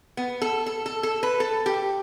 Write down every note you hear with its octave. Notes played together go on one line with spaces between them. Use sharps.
B3
A4
A4
A4
A4
B4
A4
G4